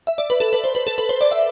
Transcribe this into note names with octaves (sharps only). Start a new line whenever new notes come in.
E5
D5
B4
A4
B4
C5
B4
A4
B4
C5
D5
E5